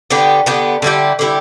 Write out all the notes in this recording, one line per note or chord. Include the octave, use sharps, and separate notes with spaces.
D3 B3 G4
D3 B3 G4
D3 G3 E4 G4
D3 G3 E4 G4